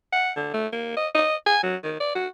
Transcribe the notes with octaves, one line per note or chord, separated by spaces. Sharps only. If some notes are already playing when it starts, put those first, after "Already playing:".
F#5
D3
A3
A#3
D#5
D#5
G#5
F#3
D#3
D5
F#4